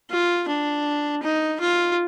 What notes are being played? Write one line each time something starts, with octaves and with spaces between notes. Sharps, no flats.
F4
D4
D#4
F4